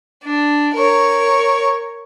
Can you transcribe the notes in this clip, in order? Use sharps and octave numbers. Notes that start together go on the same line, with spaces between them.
D4
A#4 C#5